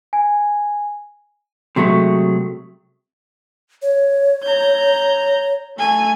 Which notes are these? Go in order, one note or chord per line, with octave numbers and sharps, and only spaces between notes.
G#5
C3 F#3 G#3 A3
C#5
A#5 G6
A3 G#5